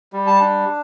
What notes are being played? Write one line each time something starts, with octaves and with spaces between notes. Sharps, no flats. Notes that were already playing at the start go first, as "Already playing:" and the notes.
G3
A5
D4